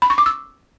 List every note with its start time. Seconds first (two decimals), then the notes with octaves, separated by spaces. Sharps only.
0.02 B5
0.10 C#6
0.18 D6
0.26 E6